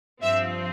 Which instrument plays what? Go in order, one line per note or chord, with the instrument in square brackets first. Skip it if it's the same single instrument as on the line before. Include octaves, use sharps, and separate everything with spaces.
[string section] G2 F3 C4 E5